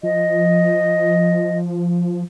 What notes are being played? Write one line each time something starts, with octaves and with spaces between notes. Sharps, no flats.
F3 D#5